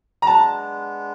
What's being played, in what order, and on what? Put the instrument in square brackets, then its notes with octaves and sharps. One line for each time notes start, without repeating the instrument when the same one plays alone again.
[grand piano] A#5
[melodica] G#3 B3 D4 [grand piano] A5